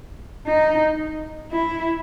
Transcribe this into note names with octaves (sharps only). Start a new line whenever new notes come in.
D#4
E4